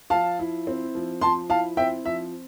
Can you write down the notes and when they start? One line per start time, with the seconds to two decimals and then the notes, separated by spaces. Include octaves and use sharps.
0.10 F3 F5 A5
0.39 E4
0.67 C4
0.95 F3
1.21 F3 A5 C6
1.50 E4 F5 A5
1.77 C4 E5 G5
2.05 F3 E5